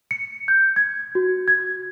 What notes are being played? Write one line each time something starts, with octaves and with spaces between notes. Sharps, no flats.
C#7
G6
G#6
F#4
G#6